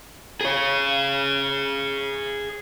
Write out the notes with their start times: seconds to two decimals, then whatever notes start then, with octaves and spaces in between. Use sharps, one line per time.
0.41 G#4 C#5